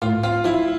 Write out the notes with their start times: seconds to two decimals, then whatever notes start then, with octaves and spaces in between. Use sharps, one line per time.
0.02 A2 F4
0.23 C4 F4
0.44 F3 E4